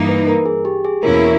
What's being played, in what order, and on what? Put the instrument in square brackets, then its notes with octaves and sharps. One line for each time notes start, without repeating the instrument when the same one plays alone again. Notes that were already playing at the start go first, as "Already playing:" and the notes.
Already playing: [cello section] G2 E3 A#3 D#4
[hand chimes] B4
A#4
G#4
G4
G#4
[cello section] E2 B2 A#3 C#4 E4 [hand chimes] A#4